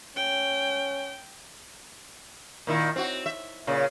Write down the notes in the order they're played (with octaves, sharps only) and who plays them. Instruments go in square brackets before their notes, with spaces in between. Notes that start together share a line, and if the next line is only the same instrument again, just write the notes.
[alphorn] C#4 [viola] G5
[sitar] A#2 D#3 E4
C4 F#4
E5
A#2 C#3